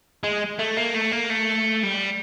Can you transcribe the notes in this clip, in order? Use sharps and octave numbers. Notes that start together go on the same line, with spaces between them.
G#3
A3
A#3
A3
A#3
A3
G3